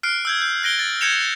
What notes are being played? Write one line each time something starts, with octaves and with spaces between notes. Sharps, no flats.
F6 F#6 C7 D7
E6 G6 G#6
G6
F#6 A#6 D7 G7
A6
G6 G#6 A#6 C#7 E7 F7